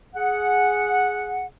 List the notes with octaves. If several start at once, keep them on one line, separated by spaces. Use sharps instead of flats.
G#4 F#5